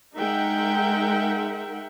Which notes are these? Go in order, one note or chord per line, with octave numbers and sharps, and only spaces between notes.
G#3 D#4 A#4 E5 F#5 G5